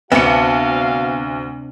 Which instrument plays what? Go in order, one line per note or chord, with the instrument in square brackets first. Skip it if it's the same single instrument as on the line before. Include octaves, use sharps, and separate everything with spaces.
[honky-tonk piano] D2 C#7 [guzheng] C3 D4 [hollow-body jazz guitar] B3 [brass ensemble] F#4 F5